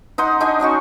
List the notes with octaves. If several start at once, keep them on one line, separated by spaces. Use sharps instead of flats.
D#4 F#5 C6
D4 D#4 D#5 G#5
C#4 D4 F#4 C#6